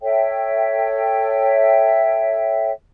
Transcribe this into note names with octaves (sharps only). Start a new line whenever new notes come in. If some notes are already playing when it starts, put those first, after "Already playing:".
A4 C#5 E5 G5